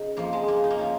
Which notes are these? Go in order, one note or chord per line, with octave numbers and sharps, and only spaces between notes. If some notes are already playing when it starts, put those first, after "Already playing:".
Already playing: C#3 D#4
F2 F3 A#3
G#3
A#3
D#4
A#3
F3 C#4